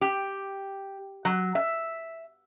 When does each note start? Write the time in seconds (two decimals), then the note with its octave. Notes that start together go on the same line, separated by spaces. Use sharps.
0.01 G4
1.25 F#3
1.55 E5